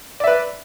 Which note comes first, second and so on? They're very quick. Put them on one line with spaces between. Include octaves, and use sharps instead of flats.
D5 E5 B4